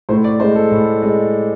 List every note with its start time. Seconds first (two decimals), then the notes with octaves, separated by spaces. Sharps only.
0.09 A2 C5
0.24 D5
0.40 G#3 C5
0.56 A4
0.71 A2
1.02 G#3